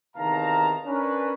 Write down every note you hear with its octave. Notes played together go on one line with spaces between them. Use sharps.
E2 C3 D#3 F5 A5 A#5
C#4 D4 A#4 B4